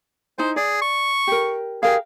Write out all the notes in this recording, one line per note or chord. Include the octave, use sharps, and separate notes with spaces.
D#4 E4 C5 G#5
G#4 D5
C#6
G4 A#4
G4 G#4 A#4 F5